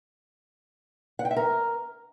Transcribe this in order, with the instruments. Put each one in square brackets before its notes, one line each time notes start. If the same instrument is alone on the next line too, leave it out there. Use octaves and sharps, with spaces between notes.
[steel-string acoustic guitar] F#5
G5
E5
A#4